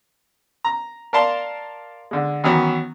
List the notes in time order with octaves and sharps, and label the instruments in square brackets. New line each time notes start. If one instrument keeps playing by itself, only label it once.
[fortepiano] A#5
A#4 D5 F5 A5 C6
D3 G#3
D#3 E3 F#3 B3 C#4